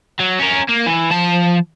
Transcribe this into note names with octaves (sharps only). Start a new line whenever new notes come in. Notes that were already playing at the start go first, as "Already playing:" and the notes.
F#3
C#4 A#4
A#3
E3
F3 A5